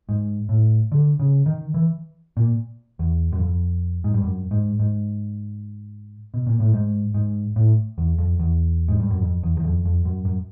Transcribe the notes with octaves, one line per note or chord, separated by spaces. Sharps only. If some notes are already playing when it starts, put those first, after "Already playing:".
G#2
A2
D3
C#3
D#3
E3
A#2
E2
F#2
F2
G#2
G2
F#2
G#2
G#2
B2
A#2
A2
G#2
G#2
A2
E2
F2
E2
G#2
G2
F#2
F2
E2
E2
F2
F2
F#2
F#2